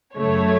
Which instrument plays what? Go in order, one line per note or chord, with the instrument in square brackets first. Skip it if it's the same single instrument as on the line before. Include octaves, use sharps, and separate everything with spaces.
[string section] F#2 C#3 F#3 A3 C#5